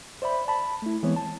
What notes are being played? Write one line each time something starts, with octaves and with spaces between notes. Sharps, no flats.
C5 D5 E5 B5
A5 B5
A3 E4
E3 G#3 B3 C4 E4 C#5
A5